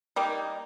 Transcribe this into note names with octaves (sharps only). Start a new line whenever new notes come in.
G3 A#3 D#4